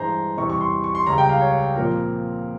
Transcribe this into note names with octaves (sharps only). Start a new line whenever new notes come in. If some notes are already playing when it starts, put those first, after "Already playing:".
Already playing: G2 E3 G#3 C5 A#5
E2 C3 E3 G3 C#6
C#6
C6
C#6
C6
C#2 C#3 G3 A#5
G5
F5
C#5
A#2 F3 C4 A#4